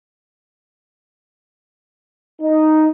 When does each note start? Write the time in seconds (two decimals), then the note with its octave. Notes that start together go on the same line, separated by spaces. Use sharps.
2.41 D#4